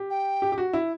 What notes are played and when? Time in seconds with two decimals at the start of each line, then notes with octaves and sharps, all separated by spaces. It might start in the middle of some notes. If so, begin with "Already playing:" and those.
Already playing: G4
0.10 G5
0.42 G4
0.52 G4
0.58 F#4
0.73 E4